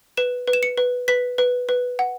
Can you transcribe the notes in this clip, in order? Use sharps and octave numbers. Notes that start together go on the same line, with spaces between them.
B4 E7
B4
E7
C#7
B4
B4 B6
B4
B4
F#5